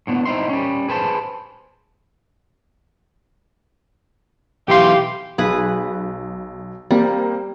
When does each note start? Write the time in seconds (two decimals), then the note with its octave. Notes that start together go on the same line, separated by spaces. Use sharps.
0.07 A2 D3 B3
0.25 C4 D#4 E4 C6
0.49 G3 C#4
0.89 G#4 B4 C5 A5
4.68 B1 E3 G4 F5 C6
5.38 B1 G#4 B4
6.91 G3 A#3 C4